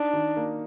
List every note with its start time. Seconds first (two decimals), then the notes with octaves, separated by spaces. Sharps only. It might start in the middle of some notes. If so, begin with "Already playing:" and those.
Already playing: D4 D#4
0.13 D#3
0.37 A#3